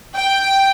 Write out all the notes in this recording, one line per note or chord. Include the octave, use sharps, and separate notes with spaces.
G5